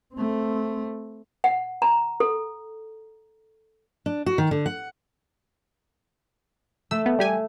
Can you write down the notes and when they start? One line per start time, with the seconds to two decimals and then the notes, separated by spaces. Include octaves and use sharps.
0.14 A3 C4
1.44 F#5
1.82 A#5
2.20 A4
4.06 D4
4.26 F#4
4.38 D#3
4.51 D3
4.66 F#5
6.91 A3 E6
7.06 B3
7.19 G3 G4 G#5